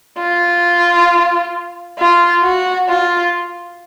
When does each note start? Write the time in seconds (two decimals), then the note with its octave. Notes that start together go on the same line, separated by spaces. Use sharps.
0.18 F4
1.98 F4
2.43 F#4
2.89 F4